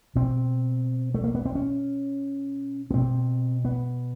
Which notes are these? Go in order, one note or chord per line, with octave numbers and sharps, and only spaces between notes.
B2 C4
A3
A#3
B3
C4
C#4
B3
B2 C4
B3